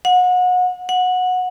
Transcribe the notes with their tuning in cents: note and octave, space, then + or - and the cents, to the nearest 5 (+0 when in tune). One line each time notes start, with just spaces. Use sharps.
F#5 -30
F#5 -15